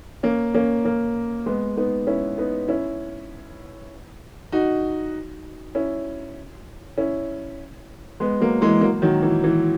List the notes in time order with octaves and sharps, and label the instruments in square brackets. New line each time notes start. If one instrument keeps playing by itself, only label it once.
[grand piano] A#3 C#4
A#3 C#4
A#3 C#4
G#3 B3
B3 D#4
C#4 E4
B3 D#4
C#4 E4
D#4 F#4
C#4 E4
C#4 E4
G#3 B3
F#3 A#3
E3 G#3
F#3 A#3
D#3 F#3
E3
E3